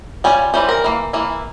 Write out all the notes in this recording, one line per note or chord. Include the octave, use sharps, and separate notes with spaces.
G3 C#4 F4 G#5
E3 G3 C#4 C5
A#4
E3 A#3
E3 A#3 E4